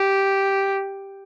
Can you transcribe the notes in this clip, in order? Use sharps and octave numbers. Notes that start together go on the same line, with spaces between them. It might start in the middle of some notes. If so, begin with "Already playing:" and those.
Already playing: G4